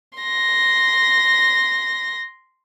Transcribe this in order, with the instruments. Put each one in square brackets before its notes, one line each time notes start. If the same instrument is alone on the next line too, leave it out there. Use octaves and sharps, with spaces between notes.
[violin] C6 A#6